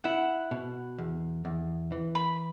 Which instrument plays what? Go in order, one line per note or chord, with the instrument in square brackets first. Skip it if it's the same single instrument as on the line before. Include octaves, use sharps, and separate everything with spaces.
[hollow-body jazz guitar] E4 [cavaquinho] F#5
[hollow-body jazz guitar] B2
E2
E2
E3
[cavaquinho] B5